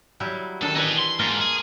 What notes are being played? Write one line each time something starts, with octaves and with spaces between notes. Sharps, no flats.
F#3 G3 E4
D#3 D4 A4
E3 B3 E4 B4 D#5
C6
G#2 A#3 F4 A#4
G#4